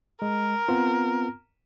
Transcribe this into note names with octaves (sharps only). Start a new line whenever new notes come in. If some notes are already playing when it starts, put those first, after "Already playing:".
G#3 A#4
B3 C4 F4